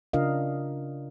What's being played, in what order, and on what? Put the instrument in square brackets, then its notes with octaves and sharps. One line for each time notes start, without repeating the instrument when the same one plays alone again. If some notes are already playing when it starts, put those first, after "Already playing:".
[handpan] C#3 D4 F4 A#4 D#5 F5